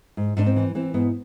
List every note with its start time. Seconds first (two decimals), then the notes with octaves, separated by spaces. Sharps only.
0.17 G#2
0.37 G#2 D4
0.46 C4
0.56 E3
0.75 E3 C4
0.94 G#2 B3